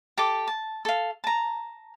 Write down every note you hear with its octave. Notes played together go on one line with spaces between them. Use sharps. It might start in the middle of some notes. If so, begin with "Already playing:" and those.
G4 A4 A5 D6
A5
A4 F5
A5 A#5